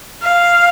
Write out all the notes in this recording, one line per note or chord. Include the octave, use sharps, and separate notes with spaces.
F5